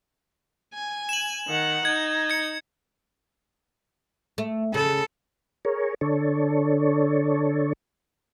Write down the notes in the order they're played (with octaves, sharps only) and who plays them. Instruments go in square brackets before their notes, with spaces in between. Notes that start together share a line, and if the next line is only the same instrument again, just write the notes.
[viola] G#5
[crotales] E7 F#7
[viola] D#3 F#5
[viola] D#4 [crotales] G#6
[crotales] G#6 C#7
[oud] A3
[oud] C#3 [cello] A4
[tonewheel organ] G#4 A#4 C#5
D3 D4 A4 C#5